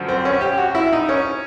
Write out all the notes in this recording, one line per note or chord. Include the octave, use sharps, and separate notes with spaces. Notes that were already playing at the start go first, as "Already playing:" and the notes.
Already playing: F#2 D3 F3
C4
C#4
G4
F#4
E4
D#4
C#4